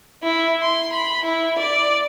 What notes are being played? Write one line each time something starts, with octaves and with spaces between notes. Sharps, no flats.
E4
C6
B5
E4
D5